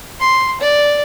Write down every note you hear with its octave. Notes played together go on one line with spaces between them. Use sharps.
C6
D5